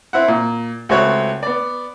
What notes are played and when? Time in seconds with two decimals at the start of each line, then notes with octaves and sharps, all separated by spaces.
0.13 C4 E4 F#5
0.28 A#2
0.89 C#2 A3 C4 F#4 C#5 F#6
1.43 B3 D5